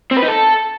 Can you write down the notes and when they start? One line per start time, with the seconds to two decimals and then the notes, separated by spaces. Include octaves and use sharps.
0.11 C4
0.17 B4
0.22 D#4
0.28 A4